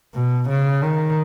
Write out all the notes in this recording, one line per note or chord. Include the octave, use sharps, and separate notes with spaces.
B2
C#3
D#3